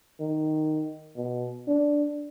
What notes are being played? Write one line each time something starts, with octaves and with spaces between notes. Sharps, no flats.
D#3
B2
D4